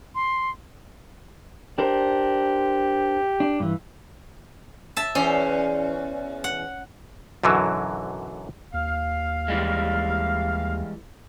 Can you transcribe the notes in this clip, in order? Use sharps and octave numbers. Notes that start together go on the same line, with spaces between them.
C6
D4 G4 A#4 C5
D4
G2 E3
E5 A5
E2 C#4 C5 D5
F#5
B1 F#2 D3 E3 F#3
D#2 F5
E3 G3 G#3